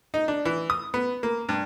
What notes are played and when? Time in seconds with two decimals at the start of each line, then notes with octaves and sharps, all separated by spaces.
0.14 D#4
0.28 D4
0.45 E3
0.70 D#6
0.94 B3
1.23 A#3
1.49 G2